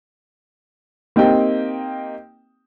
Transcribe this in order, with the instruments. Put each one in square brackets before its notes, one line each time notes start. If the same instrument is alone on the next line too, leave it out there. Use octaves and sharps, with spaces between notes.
[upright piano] A#3 C4 D#4 G4 G5